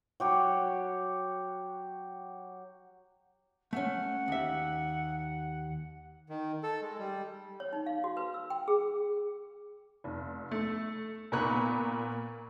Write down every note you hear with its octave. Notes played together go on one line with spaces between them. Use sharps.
F#3 G4 C#5
A3 C#4 F#5
D#2 E5
D#3
A4
G#3
G3
C#5
D#4
F5
F#4
B4
E6
G5
G#4
F1
A3
A#2 B3 A#4 B5 C#6 F#6